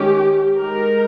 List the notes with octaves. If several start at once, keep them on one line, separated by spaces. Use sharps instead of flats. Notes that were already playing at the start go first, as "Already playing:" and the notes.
Already playing: D#3 G#3 C#4 G4
G#3 D#4 A#4